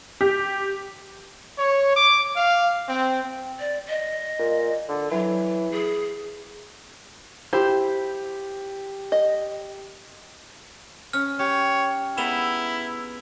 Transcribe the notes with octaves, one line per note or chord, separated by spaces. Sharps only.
G4
C#5
D6
F5
C4
D5
D#5
A#2
D3
E3 F#3
G#4
E4 G4 C5
D#5
C#4 F6
G4 C#5
G#3 B3 D#4 E4 E7 F7 G7